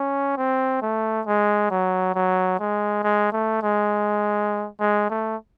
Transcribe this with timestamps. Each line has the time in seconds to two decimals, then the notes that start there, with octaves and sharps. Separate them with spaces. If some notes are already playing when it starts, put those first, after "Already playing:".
Already playing: C#4
0.37 C4
0.81 A3
1.26 G#3
1.71 F#3
2.15 F#3
2.59 G#3
3.03 G#3
3.32 A3
3.62 G#3
4.80 G#3
5.10 A3